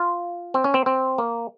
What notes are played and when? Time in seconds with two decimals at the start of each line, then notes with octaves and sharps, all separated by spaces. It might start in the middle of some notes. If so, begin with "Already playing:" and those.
Already playing: F4
0.54 C4
0.64 C#4
0.74 C4
0.86 C4
1.18 A#3